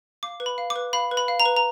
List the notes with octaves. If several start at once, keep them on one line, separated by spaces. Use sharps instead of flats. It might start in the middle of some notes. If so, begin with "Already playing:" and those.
F5 D6
B4
B5
F5
D6
B4
F5 B5
B4
B5
F5
A#5
B4
A#5